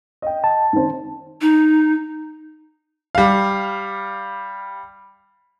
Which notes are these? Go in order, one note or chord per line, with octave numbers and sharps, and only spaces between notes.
D#5 G5
A5
D#3 C4
D#4
G3 F5